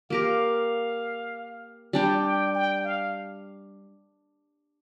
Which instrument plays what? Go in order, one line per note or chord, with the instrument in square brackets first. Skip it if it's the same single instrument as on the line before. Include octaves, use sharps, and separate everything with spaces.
[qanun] A#3 G4 A#4 [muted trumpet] F5
[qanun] G3 D4 G4 [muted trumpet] G5
[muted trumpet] G5
G5
F5